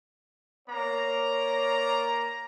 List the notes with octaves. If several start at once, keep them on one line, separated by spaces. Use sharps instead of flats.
A#3 C#5 D5 A#5